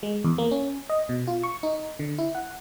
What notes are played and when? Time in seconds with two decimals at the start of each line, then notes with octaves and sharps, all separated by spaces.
0.03 G#3
0.24 E2
0.38 A#3
0.51 C#4
0.89 D#5
1.09 B2
1.27 F4
1.43 C#6
1.63 D#4
1.99 D3
2.18 E4
2.35 F#5